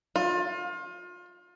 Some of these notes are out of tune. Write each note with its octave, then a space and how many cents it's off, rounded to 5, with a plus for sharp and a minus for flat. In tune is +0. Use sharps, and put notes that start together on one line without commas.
F4 +30